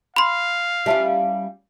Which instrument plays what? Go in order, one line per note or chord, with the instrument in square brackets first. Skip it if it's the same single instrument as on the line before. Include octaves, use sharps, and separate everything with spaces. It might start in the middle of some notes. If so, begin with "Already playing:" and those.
[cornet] F5 [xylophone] B5 C6
[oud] G3 C#4 F4 [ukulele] E4 E5 A5